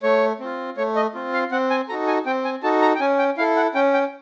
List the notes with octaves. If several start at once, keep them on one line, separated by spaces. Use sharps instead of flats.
A3 C#5
C4 F4
A3 C#5
D#5
C4 F4
F5
C4 F#5
G#5
D#4 F#4 A4 A#5
G#5
C4 G5
G#5
D#4 F#4 A4 A5
A#5
G5
C#4 G#5
G5
E4 A4 F5
F#5
C#4 G5
G5